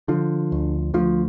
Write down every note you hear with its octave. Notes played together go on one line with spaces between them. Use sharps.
D3 F3
D2
D2 F3